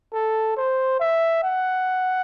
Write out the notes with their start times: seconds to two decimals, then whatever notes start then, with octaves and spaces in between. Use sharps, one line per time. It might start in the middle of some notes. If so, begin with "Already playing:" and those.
0.14 A4
0.57 C5
1.00 E5
1.43 F#5